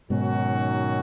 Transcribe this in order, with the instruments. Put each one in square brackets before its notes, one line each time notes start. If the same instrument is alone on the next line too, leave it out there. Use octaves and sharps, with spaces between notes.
[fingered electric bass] G#2 B2 [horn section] D#3 F#3 C#4 F#4